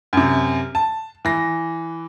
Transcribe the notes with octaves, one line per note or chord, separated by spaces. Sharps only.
F#2 C3
A5
E3 A#6